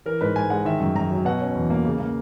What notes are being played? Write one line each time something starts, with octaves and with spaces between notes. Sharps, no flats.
E3 A#4
G#2 B4
G#2 G#5
G#3 F#5
D#3 E5
F#2
F#2 A#5
F#3
B2 F#5
C#4
E2
A#3
C#3
A#3